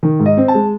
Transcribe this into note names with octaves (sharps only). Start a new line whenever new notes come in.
D#3
G#2
D#5
C4
A5
G#3